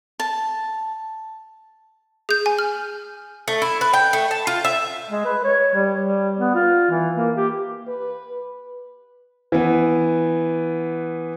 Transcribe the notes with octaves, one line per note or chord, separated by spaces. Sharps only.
A5
G#4 G6
G#5
F6
A3
E4
B4
G5
A3
A5
F4
E5
G#3
B4
C#5
G3
G3
B3
F4
E3
A#3
G4
B4
E3 B3